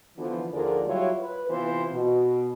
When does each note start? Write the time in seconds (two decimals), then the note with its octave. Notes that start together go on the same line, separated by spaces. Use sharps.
0.18 D3 E3 F3 B3
0.53 D#2 D3 F3 G#4 A#4 D5
0.87 F#3 G3 E4 F4 C#5
1.20 B4
1.50 C3 E3 B3 F4 C5
1.91 B2